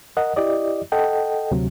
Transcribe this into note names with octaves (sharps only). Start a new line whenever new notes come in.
A#4 D#5 F#5
E4 G4 D5 D#5
A4 D#5 F#5 G5
D2 C3 F#3